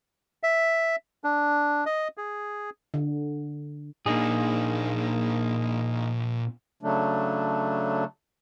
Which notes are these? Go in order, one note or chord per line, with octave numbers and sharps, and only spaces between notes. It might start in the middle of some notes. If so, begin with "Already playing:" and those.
E5
D4
D#5
G#4
D3
A#2 A#3 D4 D#4 G#4
C#3 F#3 A3 D4